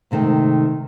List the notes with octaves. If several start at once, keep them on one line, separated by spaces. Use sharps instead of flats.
G#2 C3 D#3 A3 G5